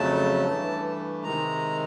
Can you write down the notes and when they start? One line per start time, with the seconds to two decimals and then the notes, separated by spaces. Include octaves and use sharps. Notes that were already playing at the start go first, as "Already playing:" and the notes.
Already playing: F2 C#3 F#3 A3 A5
0.48 G2 E3 A3
1.24 C3 D#3 G#3 A#5